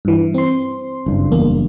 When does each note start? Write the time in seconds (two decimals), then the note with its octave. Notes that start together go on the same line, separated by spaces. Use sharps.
0.05 G2 E3
0.34 C4 C6
1.06 F#1 G2
1.31 E2 A#3